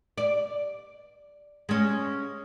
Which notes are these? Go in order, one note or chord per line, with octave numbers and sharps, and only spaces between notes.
D5
G#3 C#4